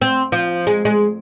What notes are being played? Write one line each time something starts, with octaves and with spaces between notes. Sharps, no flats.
C4
F3
G#3
G#3